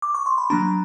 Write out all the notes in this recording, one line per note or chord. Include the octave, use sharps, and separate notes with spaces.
D6
C#6
C6
B5
F#3 A#3 D4 A#5